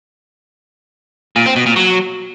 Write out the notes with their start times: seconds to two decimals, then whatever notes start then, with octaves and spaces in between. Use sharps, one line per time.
1.36 A#2
1.46 C4
1.56 B2
1.66 A#2
1.76 F#3